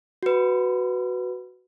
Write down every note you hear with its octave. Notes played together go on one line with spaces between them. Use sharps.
F#4 B4